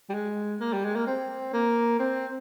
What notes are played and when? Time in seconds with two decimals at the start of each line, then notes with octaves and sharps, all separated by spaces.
0.09 G3
0.13 G#3
0.60 A#3
0.73 G3
0.85 G#3
0.96 A#3
1.07 C4
1.53 A#3
2.00 C4